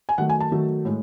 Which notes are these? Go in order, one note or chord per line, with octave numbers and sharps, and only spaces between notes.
G#5
D#3 F#3 A3 F#5
G#5
A5
D#3 F#3 A3
A2 G#3